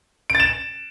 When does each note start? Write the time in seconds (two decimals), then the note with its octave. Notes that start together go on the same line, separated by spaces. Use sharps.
0.30 D7
0.35 A6
0.40 E7